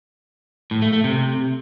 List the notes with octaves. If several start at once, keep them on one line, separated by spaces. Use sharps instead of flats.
A2
A3
A3
C3